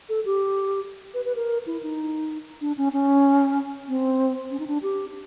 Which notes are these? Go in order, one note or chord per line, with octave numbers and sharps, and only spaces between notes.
A4
G4
B4
B4
A#4
E4
D#4
D4
C#4
C#4
C4
C#4
D#4
D4
G4